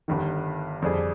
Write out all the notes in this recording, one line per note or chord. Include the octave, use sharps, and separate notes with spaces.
G1 G2 D#3
F2 D3 G3 D4 G#4